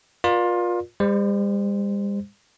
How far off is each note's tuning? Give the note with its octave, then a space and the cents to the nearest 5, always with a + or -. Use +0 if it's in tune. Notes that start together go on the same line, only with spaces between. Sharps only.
F4 +20 A#4 +40 D5 +20
G3 +45 C5 -15